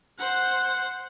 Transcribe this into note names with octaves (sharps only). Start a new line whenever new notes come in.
C5 F#5